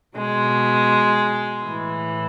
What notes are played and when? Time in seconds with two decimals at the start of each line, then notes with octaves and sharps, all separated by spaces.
0.16 B2 G#3
1.65 A2 E3